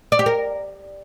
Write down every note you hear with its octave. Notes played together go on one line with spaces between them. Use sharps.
D5
G4
A#4